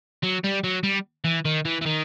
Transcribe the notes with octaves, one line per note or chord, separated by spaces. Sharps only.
F#3
G3
F#3
G3
E3
D#3
E3
E3
D#3